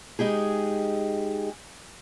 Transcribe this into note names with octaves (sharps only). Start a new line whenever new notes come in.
G#3 D#4 G4 G#4